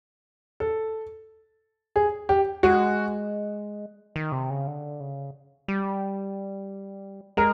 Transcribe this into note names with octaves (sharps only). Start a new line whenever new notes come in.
A4
G#4
G4
G#3 F#4
D#3
C3
C#3
D3
C#3
G3
G#3 A#4